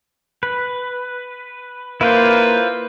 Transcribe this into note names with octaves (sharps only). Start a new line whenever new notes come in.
B4
A#3 E4 F4 B4 C5